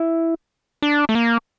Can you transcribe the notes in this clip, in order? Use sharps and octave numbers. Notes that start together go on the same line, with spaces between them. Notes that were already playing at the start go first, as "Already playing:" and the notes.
Already playing: E4
D4
A3
A#3